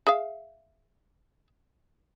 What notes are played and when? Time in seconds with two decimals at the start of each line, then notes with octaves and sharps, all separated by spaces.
0.07 G#4 E5 F5